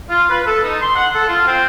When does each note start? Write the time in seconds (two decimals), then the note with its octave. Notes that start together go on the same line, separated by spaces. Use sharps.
0.09 F4
0.30 B4
0.46 A4
0.64 D#4
0.81 C6
0.96 F#5
1.15 A4
1.28 F4
1.47 C4